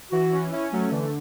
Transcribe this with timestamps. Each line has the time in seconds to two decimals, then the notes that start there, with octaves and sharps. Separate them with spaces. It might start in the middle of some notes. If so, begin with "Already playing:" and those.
0.11 E3 F#4
0.32 C#4
0.51 C#4 E4
0.72 F#3 A3
0.91 D3 E3